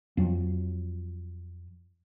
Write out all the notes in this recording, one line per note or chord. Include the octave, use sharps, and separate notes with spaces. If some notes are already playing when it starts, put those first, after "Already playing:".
F2 F#3